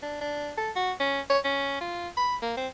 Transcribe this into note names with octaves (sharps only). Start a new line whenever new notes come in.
D4
D4
A4
F#4
C#4
C#5
C#4
F4
B5
A#3
C4